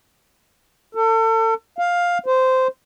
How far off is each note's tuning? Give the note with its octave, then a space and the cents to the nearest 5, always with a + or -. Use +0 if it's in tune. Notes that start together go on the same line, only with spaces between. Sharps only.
A4 +35
F5 +10
C5 -15